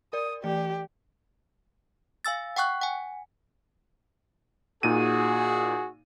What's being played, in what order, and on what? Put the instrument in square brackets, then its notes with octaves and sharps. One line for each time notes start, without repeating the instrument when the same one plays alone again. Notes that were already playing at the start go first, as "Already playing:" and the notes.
[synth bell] A#4 D5 [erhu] D#6
[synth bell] E3 A3 D5 [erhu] G4
[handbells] F5 G#5 E6 A6
F#5 G5 C#6 F#6
F#5 G#5
[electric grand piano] A#2 D#4 D#7 [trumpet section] F#4 G#4